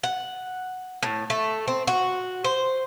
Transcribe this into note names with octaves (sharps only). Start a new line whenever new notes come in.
F#5
A2
A3
C4
F#4
C5